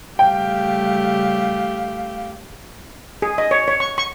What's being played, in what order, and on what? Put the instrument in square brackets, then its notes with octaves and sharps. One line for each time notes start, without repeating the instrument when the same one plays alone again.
[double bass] C#3 G3 [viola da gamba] A3 G4 [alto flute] F5 [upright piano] G5
[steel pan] G#4
D#5
C#5
C#5
C#6
C#6